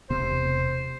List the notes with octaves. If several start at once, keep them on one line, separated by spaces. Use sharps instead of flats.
E1 C3 B3 C5